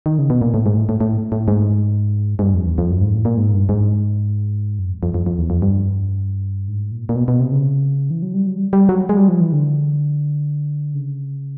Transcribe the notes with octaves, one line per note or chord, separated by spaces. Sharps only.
D#3
C#3
B2
A#2
A2
G#2
A2
A2
A2
A2
G#2
G#2
G2
F2
E2
F2
F#2
G#2
A2
A#2
G#2
G2
G#2
F#2
F2
F2
F2
F2
E2
F2
G2
G#2
A#2
A#2
B2
B2
C3
C#3
E3
F#3
G3
F#3
G3
G3
F#3
G#3
G3
F3
E3
D3
C#3